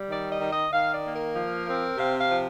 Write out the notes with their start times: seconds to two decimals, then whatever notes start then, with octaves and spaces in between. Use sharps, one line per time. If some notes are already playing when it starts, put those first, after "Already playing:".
Already playing: G3
0.10 D#3 D5
0.31 D#5
0.40 D#3
0.52 D#5
0.72 D#3 F5
0.93 D5
1.04 A#3
1.14 A#4
1.35 F3
1.67 C4
1.97 C3 F5
2.18 F5
2.29 F3